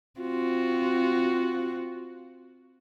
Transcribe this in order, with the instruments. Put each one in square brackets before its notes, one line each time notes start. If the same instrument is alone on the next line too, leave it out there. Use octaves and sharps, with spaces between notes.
[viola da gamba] C4 F4 F#4